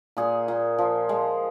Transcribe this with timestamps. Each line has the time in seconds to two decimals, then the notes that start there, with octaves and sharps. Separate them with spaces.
0.17 A#2 G#4
0.48 A#2
0.78 F3
1.09 G#3